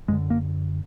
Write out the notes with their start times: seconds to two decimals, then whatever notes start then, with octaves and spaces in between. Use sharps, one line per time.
0.08 F#2 D3 G#3
0.30 A#3